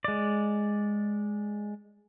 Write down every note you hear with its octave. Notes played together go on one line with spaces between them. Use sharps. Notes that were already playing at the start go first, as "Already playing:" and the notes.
G#3 D5